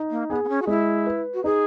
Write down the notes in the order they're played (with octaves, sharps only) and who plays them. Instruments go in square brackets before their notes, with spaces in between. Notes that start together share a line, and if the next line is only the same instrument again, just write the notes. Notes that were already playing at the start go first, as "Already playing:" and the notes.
Already playing: [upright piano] D#4
[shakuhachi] A#3
[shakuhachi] B3 [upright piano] G#4
[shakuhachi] B3
C#4
F#4
[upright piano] G#3 [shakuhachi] E4
[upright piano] B4
[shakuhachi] F#4
[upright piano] D#4 [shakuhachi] G#4